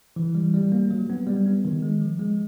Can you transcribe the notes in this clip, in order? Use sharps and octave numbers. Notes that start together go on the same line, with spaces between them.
E3
G3
G3
A#3
F#3
B3
G3
B3
D#3
G#3
F3
G#3